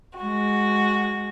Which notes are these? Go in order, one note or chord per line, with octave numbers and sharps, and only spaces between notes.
G#3 F#4